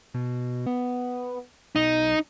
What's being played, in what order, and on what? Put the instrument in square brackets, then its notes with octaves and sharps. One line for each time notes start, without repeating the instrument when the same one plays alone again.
[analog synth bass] B2
B3
[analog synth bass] B1 [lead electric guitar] D#4